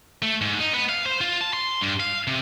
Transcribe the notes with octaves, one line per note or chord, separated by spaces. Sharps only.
A3
G#2
D#4
B3
F5
C5
F4
A5
C6
G2
F5
C3